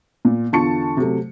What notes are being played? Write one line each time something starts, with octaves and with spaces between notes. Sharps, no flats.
A#2
E2 D3 F4 A5 C#6 C#7
C3 F#3 A3